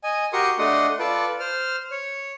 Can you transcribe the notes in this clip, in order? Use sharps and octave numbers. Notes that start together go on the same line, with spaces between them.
D#5 G#5
F#4 G4 A#4 C6 C#6 D#6
A3 D4 D#5 F#5 C6
F4 A4 B4 D5
C5 F6
C#5